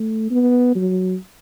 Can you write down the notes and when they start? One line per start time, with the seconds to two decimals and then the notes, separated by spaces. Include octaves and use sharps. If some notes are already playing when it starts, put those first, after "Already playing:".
Already playing: A3
0.30 B3
0.75 F#3